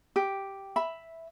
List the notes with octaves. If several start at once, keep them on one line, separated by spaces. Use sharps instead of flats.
G4
E5 B5